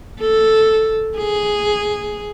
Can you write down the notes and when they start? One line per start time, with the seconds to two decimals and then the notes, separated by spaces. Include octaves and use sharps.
0.21 A4
1.17 G#4